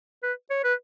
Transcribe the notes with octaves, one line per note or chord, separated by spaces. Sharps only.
B4
C#5
B4